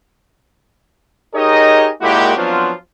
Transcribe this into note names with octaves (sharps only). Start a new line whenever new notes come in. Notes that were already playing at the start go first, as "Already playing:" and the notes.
D#4 G4 G#4 A#4 C#5 D#5
A#2 G#3 A#3 E4 F#4 G4
F3 F#3 B3 C4 D4 F4